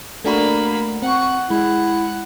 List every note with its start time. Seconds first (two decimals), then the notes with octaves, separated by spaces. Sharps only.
0.24 A3 A#3 D4 F#4 B5
1.02 C4 F#5 C#6
1.50 G#3 E4 F#5